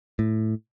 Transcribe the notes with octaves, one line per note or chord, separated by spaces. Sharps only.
A2